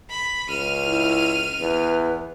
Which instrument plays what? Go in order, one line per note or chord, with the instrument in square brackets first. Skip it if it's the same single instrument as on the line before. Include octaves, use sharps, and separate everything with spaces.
[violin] B5
[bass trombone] C#2 [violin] F6 D#7
[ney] E4
[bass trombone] E2 [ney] B4